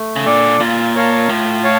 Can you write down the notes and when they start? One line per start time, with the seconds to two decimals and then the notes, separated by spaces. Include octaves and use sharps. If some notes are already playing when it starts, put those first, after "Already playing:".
Already playing: A3
0.16 C#3
0.26 A#2 D4 A4 D5
0.60 A#2 F4
0.95 A#4 C#5 F5 A5
1.30 A2 F4
1.64 C#5 F5 A5